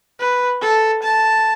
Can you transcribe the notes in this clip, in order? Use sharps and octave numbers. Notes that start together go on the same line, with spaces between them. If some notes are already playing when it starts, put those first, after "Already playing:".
B4
A4
A5